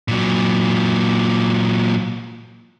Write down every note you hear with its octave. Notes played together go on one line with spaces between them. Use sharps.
A#2 F#3